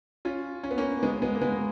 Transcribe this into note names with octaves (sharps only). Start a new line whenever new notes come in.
C#4 F4
C#4
B3
A#3 C#4
G#3 B3
G#3 B3
A#3
G#3 B3